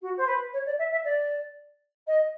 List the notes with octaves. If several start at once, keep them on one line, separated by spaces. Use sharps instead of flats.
F#4
C5
B4
C#5
D5
E5
E5
D5
D#5